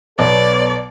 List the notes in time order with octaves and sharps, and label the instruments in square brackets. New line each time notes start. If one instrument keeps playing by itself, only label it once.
[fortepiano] B1 [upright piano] B3 [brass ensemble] A4 C#5 [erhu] D5